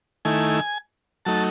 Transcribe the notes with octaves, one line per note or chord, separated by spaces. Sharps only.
D#3 A3 E4 G#5
F#3 A3 D#4 A5